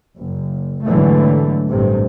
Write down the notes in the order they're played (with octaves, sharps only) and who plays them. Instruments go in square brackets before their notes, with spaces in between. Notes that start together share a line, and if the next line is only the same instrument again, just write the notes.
[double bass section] F#1
G#2 B2 D3 E3 F#3 A3
A1 G2 C3